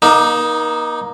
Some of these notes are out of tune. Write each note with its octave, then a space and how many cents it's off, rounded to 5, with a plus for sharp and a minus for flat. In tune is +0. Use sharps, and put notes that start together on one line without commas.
A#3 +35 D#4 +0